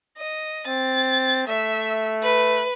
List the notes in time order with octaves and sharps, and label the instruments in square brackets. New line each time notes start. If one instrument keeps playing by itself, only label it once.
[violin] D#5
[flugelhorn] C4 [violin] A6
[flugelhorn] A3 [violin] E5
[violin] B4